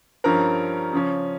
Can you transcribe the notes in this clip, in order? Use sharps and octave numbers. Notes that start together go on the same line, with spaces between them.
G2 F3 C#4 A#4 A#5
C#3 F3 C#4